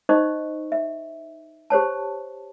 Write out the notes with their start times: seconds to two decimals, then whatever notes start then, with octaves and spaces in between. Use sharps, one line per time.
0.09 D#4 C5 D#5 C#6
0.72 E5
1.70 G4 C5 C#5 A5